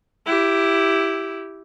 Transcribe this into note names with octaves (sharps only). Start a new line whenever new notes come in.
E4 G4